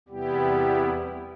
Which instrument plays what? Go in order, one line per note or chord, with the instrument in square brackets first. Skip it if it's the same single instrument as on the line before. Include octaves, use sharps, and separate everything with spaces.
[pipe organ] E2 C3 G3 B3 E4 G4